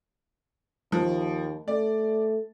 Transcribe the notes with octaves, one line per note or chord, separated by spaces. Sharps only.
D#2 F3
A3 D5